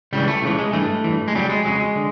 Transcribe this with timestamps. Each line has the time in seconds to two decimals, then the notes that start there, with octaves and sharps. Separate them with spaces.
0.13 C#2 C#3 E3 G3
0.28 A3
0.42 C#2 C#3 E3 A3
0.59 G#3
0.73 G2 E3 A3
1.04 G2 E3
1.28 G#3
1.34 F2 C#3 F#3 G3
1.50 G#3
1.65 F2 C#3 F#3 G#3
1.96 D3